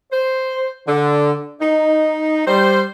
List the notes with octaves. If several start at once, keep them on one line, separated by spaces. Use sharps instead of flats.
C5
D3
D#4
G3 C5